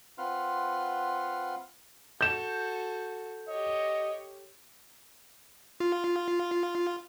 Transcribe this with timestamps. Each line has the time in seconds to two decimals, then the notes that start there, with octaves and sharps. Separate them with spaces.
0.18 C4 F4 B4 F#5 C6 F6
2.21 F#4 A4 G6 E7
3.48 G4 C#5 D#5
5.80 F4